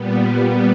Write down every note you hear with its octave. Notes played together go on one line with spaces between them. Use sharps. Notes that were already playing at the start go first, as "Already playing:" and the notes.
Already playing: A#2 G3 B3